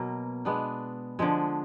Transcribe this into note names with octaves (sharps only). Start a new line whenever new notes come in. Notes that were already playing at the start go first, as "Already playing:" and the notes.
Already playing: B2 F#3 A#3
G#3 B3 D4
D3 F3 G#3